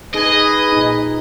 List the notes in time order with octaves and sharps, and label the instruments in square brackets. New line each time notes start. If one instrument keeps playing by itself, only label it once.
[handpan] D#4 [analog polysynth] G#4 [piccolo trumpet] B4 [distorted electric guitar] D#5
[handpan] A#2 D#4